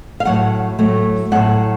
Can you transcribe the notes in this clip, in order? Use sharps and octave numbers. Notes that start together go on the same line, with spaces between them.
F5
A2 F#3 A3 F#5
A2 F#3 A3
A2 F#3 A3 F#5